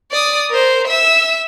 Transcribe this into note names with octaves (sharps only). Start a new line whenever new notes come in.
D5 D#6
A#4 C5
E5 E6